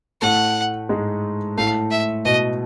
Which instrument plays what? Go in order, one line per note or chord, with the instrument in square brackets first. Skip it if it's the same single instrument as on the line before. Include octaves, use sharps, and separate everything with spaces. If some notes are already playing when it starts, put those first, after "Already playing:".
[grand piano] A2 A3 [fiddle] F#5
[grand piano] G#2 G#3
[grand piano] A2 A3 [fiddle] F5
[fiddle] E5
[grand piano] B2 B3 [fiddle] D#5